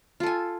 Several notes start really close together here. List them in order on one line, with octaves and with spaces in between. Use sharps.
F4 A4 G#5